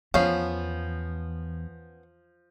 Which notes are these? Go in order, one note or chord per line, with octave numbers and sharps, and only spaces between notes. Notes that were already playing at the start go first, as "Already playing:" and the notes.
E2 F3 B3 C#4 F5